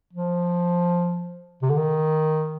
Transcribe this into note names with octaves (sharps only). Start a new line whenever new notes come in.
F3
C3
D3
D#3